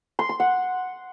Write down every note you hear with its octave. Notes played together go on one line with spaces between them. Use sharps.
C6
C6
F#5